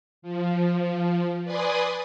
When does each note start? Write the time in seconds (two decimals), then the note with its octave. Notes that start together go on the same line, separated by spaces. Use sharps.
0.22 F3
1.44 B4 D5 G#5 C6 D#6